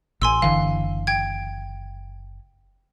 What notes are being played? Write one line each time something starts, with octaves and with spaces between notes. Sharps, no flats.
A1 G#5 C6 E6
F#1 D3 E3 F5
G5 G#6